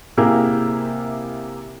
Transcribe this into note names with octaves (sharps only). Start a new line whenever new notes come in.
C3 A#3 E4 G4 G#4 A#4